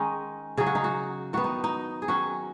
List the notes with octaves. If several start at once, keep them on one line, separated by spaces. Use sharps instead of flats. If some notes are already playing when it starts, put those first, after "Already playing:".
Already playing: D#3 G#3 C#4 D#4
C#3 F#3 C#4 G#4
F#4
D#4
F#4
D#3 B3 F#4
D#4
D#4
G#4
D#3 F#3 C#4 F#4